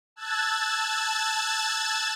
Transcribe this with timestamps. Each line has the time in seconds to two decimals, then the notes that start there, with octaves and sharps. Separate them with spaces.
0.16 A5 E6 F#6 G#6 A6